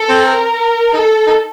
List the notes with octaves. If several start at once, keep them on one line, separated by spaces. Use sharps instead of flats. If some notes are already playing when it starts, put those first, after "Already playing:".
Already playing: A4
C4
A#4
D#4 A4
D#4